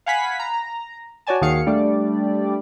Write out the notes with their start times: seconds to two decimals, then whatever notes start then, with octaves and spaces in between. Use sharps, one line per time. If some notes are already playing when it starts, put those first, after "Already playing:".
0.06 F5 F#5 G#5 B5 B6
0.40 A#5
1.27 F#4 C#5 D5 G#5 A5
1.41 D#2 D#3 F#4 G#4 F5 C#7
1.66 G3 A3 D4 D5